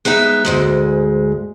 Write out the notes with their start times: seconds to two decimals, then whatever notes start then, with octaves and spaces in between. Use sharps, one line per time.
0.05 G#3 B3 D#4 E5
0.45 D2 G#2 G#3